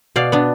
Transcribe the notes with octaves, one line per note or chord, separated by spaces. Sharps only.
B2 D5 F5
B3 D4